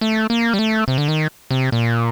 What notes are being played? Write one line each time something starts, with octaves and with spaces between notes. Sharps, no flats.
A3
A#3
G3
A3
C3
D3
D#3
C3
A#2